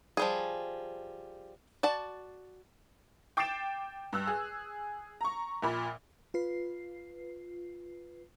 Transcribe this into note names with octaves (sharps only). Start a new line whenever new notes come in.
F3 G3 G#4
F#4 D5 A5
G5 D6 A6 C7 D7 E7
G2 E6 F#6
G#4
A#5 C#6
A#1 A#2 B5
F4 B4 C7